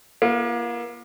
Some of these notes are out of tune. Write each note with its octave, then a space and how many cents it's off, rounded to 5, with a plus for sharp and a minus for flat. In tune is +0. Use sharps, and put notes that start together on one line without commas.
A#3 +35 F4 -35